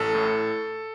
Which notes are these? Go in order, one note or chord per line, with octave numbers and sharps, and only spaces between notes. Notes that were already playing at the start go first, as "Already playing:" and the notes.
Already playing: A1 A4
A2